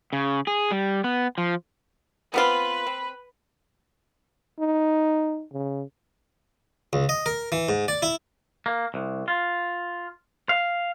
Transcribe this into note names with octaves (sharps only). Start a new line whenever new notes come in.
C#3
G#4
G3
B3
F3
B3 C4 F4 B4
C4
D#4
C#3
C#2
D#5
A#4
E3
G#2
D5
E4
A#3
C2
F4
F5